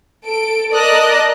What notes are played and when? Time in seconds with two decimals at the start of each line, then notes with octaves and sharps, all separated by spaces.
0.25 A4 D7
0.73 A#4 D5 D#5 A5 D#6 F#6